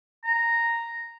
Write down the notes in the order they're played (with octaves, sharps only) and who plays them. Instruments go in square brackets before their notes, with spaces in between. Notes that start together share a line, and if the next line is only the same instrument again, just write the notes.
[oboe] A#5